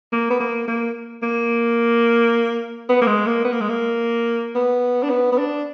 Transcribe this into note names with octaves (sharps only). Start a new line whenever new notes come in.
A#3
B3
A#3
A#3
A#3
B3
A#3
G#3
A#3
B3
A#3
G#3
A#3
B3
D4
B3
B3
D4